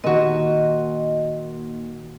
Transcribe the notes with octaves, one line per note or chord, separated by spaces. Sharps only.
A#2 D#3 A#3 F#4 D#5